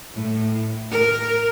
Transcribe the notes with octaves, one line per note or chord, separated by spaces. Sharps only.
A2
A#4